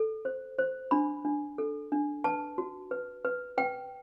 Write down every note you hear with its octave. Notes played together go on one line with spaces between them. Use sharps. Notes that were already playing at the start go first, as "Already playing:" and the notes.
Already playing: A4
C5
C5
D4 B5
D4
A4
D4
B4 A5
F#4
B4
B4
B4 G5